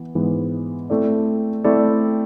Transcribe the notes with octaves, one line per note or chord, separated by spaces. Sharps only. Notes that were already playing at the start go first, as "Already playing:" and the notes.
Already playing: E3 B3
G#2 E3 G#3 B3
A3 C4 E4 A4 D5
A3 C4 E4 A4 D5